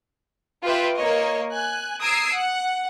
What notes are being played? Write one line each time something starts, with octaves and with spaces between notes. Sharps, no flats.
F4 G4 B4 E5 G5
A#3 C#5 D#5
G#5 F#6
A#5 D#6 E6 G#6 C7 D7
F#5